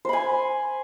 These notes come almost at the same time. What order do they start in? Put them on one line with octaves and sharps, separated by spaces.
C5 B5 G#5